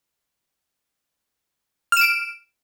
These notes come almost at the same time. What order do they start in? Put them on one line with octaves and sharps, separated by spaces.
F6 E7 D7